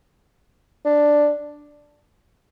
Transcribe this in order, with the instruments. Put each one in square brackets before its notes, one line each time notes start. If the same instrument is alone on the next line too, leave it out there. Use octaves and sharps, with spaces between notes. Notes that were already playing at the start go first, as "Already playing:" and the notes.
[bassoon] D4